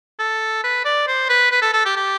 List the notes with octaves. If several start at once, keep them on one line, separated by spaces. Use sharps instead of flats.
A4
B4
D5
C5
B4
B4
A4
A4
G4
G4